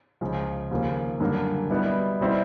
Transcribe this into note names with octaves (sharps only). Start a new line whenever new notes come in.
C#2 C#3 F3
D#2 C#3 F3 A#3
F#2 D3 G3 A#3
B2 G3 B3 E4
B2 G3 C4 E4